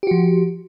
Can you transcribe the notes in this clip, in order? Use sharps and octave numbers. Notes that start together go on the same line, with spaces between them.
F3 F#4 G4